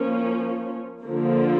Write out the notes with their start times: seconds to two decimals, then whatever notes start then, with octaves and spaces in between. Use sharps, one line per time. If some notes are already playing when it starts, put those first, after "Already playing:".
Already playing: F3 A#3 C#4
1.03 D3 F3 A#3